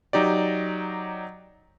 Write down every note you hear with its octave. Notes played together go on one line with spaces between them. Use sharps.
F#3 D#4 G4 D5